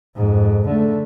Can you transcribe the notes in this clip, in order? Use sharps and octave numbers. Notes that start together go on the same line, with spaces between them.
F2 G#2
D3 A3